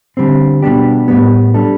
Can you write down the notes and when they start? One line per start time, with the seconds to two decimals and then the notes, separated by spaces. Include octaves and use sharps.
0.17 D3 G3 C4
0.62 B2 G3 B3 D4 G4
1.08 A2 G3 B3
1.54 G3 D4 A4